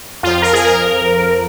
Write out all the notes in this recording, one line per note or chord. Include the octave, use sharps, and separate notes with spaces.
F2 F3 F4
A#4
G#4
A#4